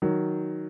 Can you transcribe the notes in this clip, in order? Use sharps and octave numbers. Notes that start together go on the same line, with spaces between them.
D#3 F#3